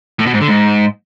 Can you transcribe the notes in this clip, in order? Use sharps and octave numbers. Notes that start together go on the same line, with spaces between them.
A2
B2
G#2
D3
G#2